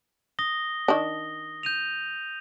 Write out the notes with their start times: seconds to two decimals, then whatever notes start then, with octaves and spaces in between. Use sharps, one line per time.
0.39 D#6 A#6 G7
0.88 D#3 D4
1.63 G6 D#7 F7